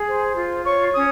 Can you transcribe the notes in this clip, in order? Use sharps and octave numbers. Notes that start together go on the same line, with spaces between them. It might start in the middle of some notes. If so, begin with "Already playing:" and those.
Already playing: G#4
C5
F4
C#5 C#6
C#4 D#6